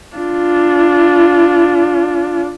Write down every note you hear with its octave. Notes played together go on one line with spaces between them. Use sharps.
D4 F4